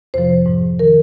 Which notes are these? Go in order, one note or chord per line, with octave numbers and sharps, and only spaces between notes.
F2 C3 F3 C5
G#2 F3
D#3 A#4